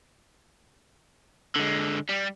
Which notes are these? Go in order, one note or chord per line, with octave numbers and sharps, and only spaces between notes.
D3 G#3
G3